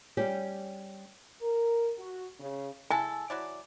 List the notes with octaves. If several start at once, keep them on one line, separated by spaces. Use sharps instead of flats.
G3 C#4 G4
A#4
F#4
C#3
G#3 E4 A4 G#5
F#3 E4 D5